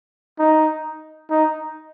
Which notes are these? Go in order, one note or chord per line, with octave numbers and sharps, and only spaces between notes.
D#4
D#4